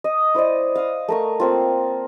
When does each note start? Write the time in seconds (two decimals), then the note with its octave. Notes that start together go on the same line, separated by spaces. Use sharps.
0.04 D#5
0.35 E4 C5 D5 D#5
0.76 F5 D#6
1.08 A3 A#4 C#6
1.40 A#3 C4 F4